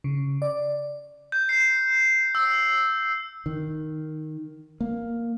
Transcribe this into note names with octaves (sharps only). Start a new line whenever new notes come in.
C#3
D5
G6
C7
E6
D#3
A#3